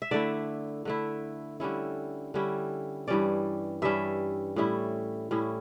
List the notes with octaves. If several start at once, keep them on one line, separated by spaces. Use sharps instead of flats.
E5
D3 A3 E4 D5
D3 A3 E4
D3 G3 C#4 E4
D3 G3 C#4 E4
G2 E3 G3 C#4 D5
G2 E3 G3 C#4 E5
A2 G3 C#4 E4
A2 G3 C#4 E4